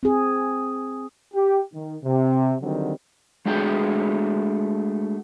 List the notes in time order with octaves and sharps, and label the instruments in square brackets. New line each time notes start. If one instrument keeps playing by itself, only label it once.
[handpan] C4 G#4
[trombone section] G4
D#3
C3
D3 D#3 F#3 G3 C4
[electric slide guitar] G#3 A3 D4 F#4 G#4 G5